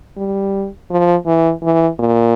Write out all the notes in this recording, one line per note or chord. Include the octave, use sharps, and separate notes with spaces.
G3
F3
E3
E3
A#2